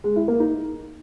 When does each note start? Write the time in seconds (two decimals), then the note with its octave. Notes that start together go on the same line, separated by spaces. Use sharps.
0.04 G#3
0.16 E4
0.28 A#3
0.40 D#4